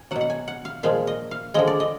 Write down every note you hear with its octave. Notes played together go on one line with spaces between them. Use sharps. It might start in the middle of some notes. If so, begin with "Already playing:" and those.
Already playing: G#5
B2 F#3 F#5
F#5
G#5
F#5
F5
A#2 F3 G#3 F5
D#5
F5
D3 F3 G#3 D#5
D5
D#5